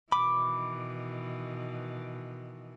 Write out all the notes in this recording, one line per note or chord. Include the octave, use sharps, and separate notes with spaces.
B2 D#3 E3 B5 D6